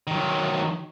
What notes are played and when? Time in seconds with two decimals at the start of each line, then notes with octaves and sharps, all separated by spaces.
0.07 D#3 F#3